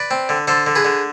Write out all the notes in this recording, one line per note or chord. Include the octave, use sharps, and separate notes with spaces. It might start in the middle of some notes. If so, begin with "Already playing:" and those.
Already playing: B4 D5
C4
D3
D3 A4 C5
D3
G#4 B4
D3